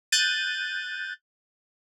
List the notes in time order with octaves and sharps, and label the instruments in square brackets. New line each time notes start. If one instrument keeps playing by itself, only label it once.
[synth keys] F#6 G6 A6 D#7